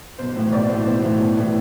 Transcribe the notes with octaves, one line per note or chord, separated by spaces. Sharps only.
B1 C5
A2 E3
B1 D5
A2 E3 C5
B1 C5
A2 E3
B1
A2 E3